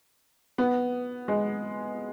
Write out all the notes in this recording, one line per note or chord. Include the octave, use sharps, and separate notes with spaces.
B3
G#3